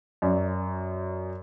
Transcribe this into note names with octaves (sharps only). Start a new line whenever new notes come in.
F#2 D5